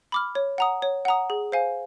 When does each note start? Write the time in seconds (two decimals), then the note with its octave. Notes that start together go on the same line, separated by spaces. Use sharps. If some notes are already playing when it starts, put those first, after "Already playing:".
0.12 B5 D6 F6
0.35 C#5
0.58 F#5 A#5 D#6
0.82 C#5
1.05 F#5 A#5 D#6
1.30 G#4
1.52 C5 F5 G#5